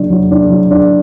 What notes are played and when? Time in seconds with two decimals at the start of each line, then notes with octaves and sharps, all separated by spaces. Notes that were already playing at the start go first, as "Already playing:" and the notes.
Already playing: F#3 D4
0.10 F#3
0.31 D4
0.50 F#3
0.70 D4